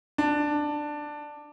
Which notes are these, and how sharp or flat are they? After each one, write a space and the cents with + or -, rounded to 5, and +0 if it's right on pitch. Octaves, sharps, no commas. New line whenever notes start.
D4 +10